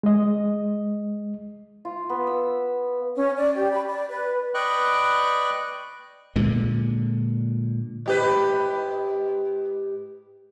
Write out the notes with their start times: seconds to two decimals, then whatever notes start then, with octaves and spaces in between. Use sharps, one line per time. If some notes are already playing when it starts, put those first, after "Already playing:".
0.03 G#3 D#5
1.85 F4
2.09 B3
2.27 E6
3.16 C#4
3.38 D5
3.56 G4
3.72 B5
3.87 D5
4.09 B4
4.54 B4 D5 D#5 G5 C#6 F#6
6.36 A#2 D3 G#3
8.06 G#2 G4 B4